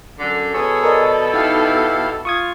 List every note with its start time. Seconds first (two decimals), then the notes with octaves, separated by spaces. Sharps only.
0.18 F#2 D3
0.54 B2 G#4 A4 C#5
0.84 A#4 D5 D#5
1.34 D#4 E4 G4 F5
2.25 F4 C#6 D#6 G#6